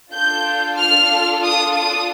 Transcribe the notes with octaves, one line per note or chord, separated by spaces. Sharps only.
D4 F4 A4 G6
F6
D#6
D#6